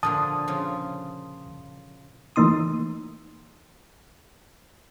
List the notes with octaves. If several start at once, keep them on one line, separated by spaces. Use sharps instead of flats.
A#2 D3 F3 A5 D#6
C#3 F3
E3 A3 A#3 D#4 C6 D#6